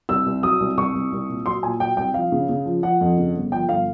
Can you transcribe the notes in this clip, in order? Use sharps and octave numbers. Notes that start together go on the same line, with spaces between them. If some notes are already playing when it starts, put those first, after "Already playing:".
C2 E6
C2
F#3 D#6
C2
C2 C#6
C2
C2
A#2
F#3 C6
A#2 G#5
F#3 G5
C2 G5
F3 F5
C#3
C#3
F3
F3 F#5
F2
C#3
G1
F3 G5
G1 F5